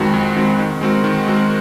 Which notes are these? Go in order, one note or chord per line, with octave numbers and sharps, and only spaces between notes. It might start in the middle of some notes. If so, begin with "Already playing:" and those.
Already playing: F2 D#3 G#3 C4 F#4
F2
D#3 G#3 C4 F#4
D#3
G#3 C4 F#4 A#4
D#3
G#3 C4 F#4 A#4